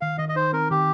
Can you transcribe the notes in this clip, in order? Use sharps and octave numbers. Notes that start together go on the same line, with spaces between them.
D#3 F5
D#3 D#5
D#5
D#4 C5
C4 A#4
D#3 G4